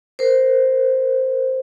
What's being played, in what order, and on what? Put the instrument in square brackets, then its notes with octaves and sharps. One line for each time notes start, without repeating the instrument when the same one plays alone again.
[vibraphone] A#4 C5